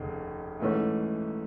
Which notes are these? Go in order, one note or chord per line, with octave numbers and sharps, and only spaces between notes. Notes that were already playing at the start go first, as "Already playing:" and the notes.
Already playing: F1 D#2 C#3
G#2 E3 A3 C#4